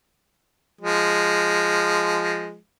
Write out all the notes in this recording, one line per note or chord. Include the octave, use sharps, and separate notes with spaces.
F3 G#3